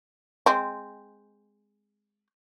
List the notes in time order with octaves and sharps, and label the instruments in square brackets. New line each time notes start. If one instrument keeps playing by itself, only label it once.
[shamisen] G#3 C4